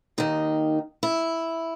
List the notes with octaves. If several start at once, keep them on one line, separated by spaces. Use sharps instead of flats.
D#2 D#3 D#4
E4